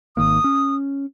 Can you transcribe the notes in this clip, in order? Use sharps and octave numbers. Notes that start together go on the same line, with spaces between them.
G#1 D#3 A#3 D#6
C#4